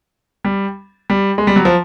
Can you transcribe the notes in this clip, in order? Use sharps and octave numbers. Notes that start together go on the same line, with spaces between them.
G3
G3
G#3
G3
F#3
F3